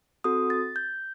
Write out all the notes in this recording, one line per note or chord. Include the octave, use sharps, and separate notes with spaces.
C4 F#4 A4 D#6
A6
G6